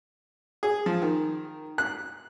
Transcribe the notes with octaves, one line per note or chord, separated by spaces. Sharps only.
G#4
F3
D#3
F#6